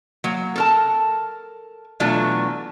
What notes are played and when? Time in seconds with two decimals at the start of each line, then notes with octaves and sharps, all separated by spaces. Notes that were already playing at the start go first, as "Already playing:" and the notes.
0.24 F#3 A#3
0.56 A4 A#4 A5
2.00 B2 E3 F#3 A3 D4 F4